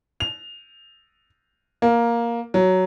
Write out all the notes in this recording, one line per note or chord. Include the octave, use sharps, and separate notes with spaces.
F7
A#3
F#3